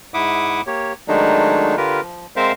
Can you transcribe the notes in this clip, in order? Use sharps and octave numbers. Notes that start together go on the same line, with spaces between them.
G#2 E4 E5 F#5 D6 D#6
A#3 G4 C#5
D#3 F#3 G#3 A3 D4 D#4
D3 F4 G4 A#4 B4
F3
G#3 C4 A#4 C5 E5 F5